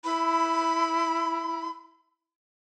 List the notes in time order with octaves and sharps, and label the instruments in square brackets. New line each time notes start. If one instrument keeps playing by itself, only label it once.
[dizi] E4 [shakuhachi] B5